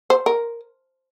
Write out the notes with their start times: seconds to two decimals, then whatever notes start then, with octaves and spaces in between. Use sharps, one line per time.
0.10 C5
0.26 A#4